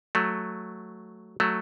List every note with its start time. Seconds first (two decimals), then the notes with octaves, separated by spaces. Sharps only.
0.15 F#3 A3
1.40 F#3 A3